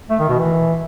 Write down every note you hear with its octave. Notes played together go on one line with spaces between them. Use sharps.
A3
D#3
B2
E3